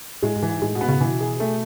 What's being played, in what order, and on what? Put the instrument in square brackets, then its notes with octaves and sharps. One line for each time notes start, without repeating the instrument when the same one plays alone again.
[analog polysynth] A2 [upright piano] G#3
[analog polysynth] G#2
[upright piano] E3
[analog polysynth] G#2
[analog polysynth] A2 [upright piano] G#3
[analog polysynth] B2
[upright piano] B3
[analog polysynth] C#3
[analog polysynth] B2 [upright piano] E3
[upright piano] G#4
A3